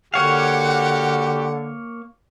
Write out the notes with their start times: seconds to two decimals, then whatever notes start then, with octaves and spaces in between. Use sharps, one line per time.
0.14 D3 A#3 F#4 G4 C#5 F5 F#5